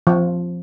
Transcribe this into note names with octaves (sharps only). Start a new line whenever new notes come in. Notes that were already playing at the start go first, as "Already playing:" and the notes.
F3